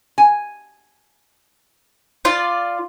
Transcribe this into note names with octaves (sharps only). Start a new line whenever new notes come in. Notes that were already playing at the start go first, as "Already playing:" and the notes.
G#5
F4 D5